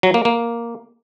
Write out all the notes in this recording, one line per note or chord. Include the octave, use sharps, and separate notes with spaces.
F#3
A#3
A#3